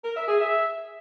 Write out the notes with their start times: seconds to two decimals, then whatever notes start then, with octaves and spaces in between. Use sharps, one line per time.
0.05 A#4
0.16 E5
0.28 G#4
0.40 E5